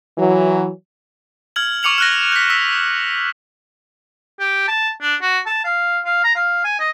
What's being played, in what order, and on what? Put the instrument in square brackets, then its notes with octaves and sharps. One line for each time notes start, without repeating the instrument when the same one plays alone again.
[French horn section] E3 F#3
[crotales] F6 G#6 F#7
C#6 D6 F6 C#7 F7 F#7
F6 F#6 A#6
G6 B6
E6 B6
[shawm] G4
A5
D4
F#4
A5
F5
F5
A#5
F5
G#5
D#5